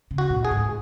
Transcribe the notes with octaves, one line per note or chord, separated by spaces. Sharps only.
C#3
F#4
A#2
G#4
G#2